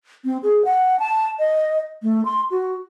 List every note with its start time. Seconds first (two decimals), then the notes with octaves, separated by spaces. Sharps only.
0.25 C4
0.43 G#4
0.65 F#5
0.99 A5
1.39 D#5
2.03 A3
2.25 C6
2.51 F#4